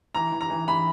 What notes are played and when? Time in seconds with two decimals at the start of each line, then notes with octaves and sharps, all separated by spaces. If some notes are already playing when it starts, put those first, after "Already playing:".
0.15 E3 A#5
0.32 E3
0.41 A#5
0.50 E3
0.67 E3 B5